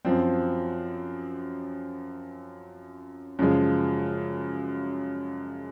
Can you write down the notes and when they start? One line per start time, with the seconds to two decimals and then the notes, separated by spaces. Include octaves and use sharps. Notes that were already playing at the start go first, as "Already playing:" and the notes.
0.05 F#2 F3 C4
3.39 F#2 C#3 F3 G#3